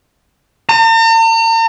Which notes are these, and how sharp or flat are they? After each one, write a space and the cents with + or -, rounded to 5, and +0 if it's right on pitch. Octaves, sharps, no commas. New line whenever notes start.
A#5 -45